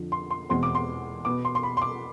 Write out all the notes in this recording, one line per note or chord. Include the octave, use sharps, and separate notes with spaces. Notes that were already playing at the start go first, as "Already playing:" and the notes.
Already playing: F2 D3 F3
C6
C6
E2 B2 G#3 C4 C6
D6
C6
B2 B3 D6
C6
C6
B5
C6
D6